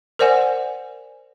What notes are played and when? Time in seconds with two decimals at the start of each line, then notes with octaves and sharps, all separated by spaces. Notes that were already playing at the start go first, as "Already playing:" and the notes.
0.19 A#4 C5 D5 F#5 G#5